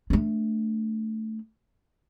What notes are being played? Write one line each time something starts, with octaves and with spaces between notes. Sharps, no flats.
A3 D4